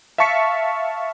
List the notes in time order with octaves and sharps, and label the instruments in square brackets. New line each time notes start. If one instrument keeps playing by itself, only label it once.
[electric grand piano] E5 F5 A5 C#6 B6 C#7